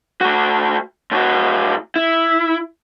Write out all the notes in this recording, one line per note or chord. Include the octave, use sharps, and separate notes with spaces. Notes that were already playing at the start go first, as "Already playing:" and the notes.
A3 F#4
A2 F#4
E4